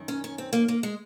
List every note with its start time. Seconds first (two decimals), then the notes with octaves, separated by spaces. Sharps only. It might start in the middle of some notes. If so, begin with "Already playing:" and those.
Already playing: F#2 D#3
0.08 C#4
0.24 C#4
0.38 C4
0.53 A#3
0.68 A#3
0.83 G#3